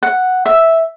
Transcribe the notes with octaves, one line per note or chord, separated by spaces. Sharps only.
F#5
E5